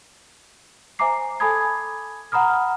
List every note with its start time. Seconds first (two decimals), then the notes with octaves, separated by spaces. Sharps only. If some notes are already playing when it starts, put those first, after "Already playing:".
0.99 C5 E5 G#5 A#5 D6 C7
1.40 A4 G#5 A5 B5 D#6 G#6
2.32 F#5 A#5 B5 D#6 F6